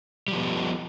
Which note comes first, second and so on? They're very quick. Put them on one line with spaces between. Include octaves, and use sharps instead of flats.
G3 F3 B3